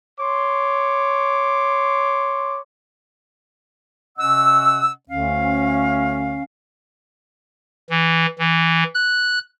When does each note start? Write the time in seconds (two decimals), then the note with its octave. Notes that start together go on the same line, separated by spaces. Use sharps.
0.19 C#5 C6 D6
4.18 C3 C#4 D#5 F#5 E6
5.09 D2 D3 C#4 F5
7.90 E3
8.39 E3
8.94 F#6